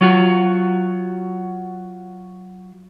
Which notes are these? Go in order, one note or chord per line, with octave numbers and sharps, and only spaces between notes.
F#3 F4 F#4